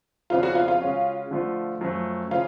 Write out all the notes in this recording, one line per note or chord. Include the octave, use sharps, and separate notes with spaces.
F2 C#3 F3 B3 D4 F4
F#4
F4
F4
C#3 G#3 C#4 F#4
D3 F3 A3 F4
F#2 F3 A3
C#3 F3 F4